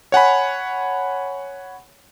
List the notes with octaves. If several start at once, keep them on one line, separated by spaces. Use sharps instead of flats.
C#5 F#5 G#5 B5